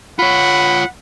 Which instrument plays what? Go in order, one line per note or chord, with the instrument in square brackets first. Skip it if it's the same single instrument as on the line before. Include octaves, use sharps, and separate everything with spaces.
[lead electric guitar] F4 C#5 [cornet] F#5 [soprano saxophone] B5